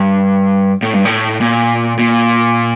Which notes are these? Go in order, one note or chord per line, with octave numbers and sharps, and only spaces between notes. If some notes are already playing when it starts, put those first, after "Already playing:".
Already playing: G2
A2
G2
A2
A#2
A#2